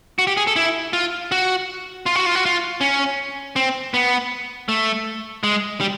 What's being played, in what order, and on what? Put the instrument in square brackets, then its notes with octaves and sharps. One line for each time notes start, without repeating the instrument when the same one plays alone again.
[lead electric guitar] F#4
G4
G#4
A4
E4
F4
F#4
F4
F#4
F4
F#4
F4
C#4
C4
B3
A3
G#3
G3